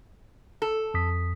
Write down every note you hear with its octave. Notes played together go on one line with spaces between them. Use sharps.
A4
F2 D#6 B6